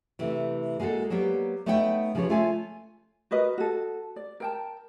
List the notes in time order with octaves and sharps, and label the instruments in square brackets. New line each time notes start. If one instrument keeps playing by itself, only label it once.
[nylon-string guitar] C3 E3 A3
G#3 A#3 F#4 G4 A4
F#3 G3 A#3 B3 G4
A3 B3 D#4 C#5 F#5 G5
C#3 F3 B3 G4 G#4 C#5
A3 F4 C#5 E5 G#5
[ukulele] F#4 A#4 B4 D#5
F#4 A4
D5
A#4 G5 A5